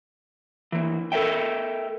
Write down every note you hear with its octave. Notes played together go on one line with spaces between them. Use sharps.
E3 A#3
A4 A#4 D5 E5 G5